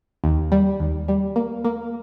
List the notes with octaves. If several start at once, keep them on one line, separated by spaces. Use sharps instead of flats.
D#2
G3
D#2
G3
A#3
A#3